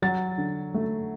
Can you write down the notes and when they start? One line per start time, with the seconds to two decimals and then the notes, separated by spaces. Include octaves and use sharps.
0.02 F#3 A6
0.38 D3
0.74 A3